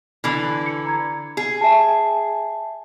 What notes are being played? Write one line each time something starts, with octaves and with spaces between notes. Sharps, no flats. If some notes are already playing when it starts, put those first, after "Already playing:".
D3 E3
C#7
A#5 G#6
G#4
E5 G#5 A5